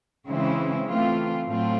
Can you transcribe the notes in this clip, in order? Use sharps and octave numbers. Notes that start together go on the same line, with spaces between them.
C#3 E3 G#3 C4 E4
E3 A3 C4 F4
A2 F#3 A3 C4 F4